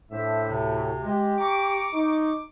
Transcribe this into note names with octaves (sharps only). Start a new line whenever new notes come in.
A2 D4 C5 E5
D2 C3
G#3 G4
A#5 C#6 D6
D#4 C#6 D6